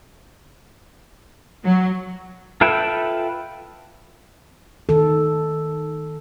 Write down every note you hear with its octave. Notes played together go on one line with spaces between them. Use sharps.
F#3
F4 A4 B4 E5 G5
D#3 A4